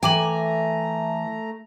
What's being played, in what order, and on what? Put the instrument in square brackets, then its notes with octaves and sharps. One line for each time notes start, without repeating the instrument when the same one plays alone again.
[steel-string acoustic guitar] E3 G#5 [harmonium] A3 A#5 [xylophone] G5 D6 F#7